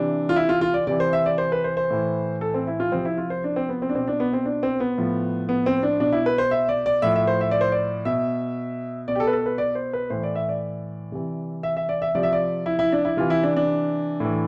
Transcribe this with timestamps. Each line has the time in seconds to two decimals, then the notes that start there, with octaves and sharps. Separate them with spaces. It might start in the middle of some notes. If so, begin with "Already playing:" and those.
Already playing: C3 E3 D4
0.29 F4
0.36 E4
0.49 F4
0.61 F4
0.74 D5
0.87 C3 E3 D5
1.00 C5
1.13 E5
1.26 D5
1.38 C5
1.52 B4
1.64 C5
1.77 C5
1.90 A2 E3
2.41 A4
2.54 C4
2.67 E4
2.80 F4
2.92 C3 F3 C4
3.05 E4
3.18 F4
3.30 C5
3.44 D4
3.56 C4
3.69 B3
3.82 C4
3.89 D4
3.95 B2 C4
4.08 D4
4.20 B3
4.33 C4
4.46 D4
4.63 C4
4.80 B3
4.98 A2 F3
5.49 B3
5.66 C4
5.83 D4
6.00 B2 D4
6.13 E4
6.26 B4
6.38 C5
6.51 E5
6.69 D5
6.86 D5
7.02 A2 F3 E5
7.16 E5
7.27 C5
7.41 E5
7.51 D5
7.61 C5
7.72 D5
8.05 B2 E5
9.08 B2 D5
9.16 G4
9.20 A4
9.27 B4
9.33 A4
9.46 B4
9.58 D5
9.75 C5
9.93 B4
10.10 A2 E3 C5
10.23 D5
10.35 E5
10.49 D5
11.12 C3 E3
11.63 E5
11.77 E5
11.89 D5
12.02 E5
12.15 C3 F3 D5
12.23 E5
12.33 D5
12.66 E4
12.79 E4
12.92 D4
13.05 E4
13.17 C3 E3 F4
13.30 E4
13.43 D4
13.57 D4
14.20 A2 E3